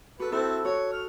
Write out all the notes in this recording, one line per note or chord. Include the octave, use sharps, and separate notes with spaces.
F#4 A4 B4
C4 E4 A4
F#4 C#5
F6